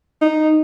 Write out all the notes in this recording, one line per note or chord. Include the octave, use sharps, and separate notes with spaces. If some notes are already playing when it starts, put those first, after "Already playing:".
D#4